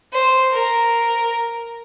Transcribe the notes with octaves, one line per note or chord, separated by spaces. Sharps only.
C5
A#4